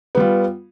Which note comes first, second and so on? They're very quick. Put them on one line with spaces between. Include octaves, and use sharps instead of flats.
B3 G3 F4